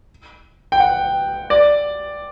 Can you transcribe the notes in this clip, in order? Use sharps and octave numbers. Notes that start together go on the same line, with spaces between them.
G5
F#5
D5